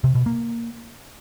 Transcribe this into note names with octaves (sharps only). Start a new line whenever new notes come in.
C3
B2
A#3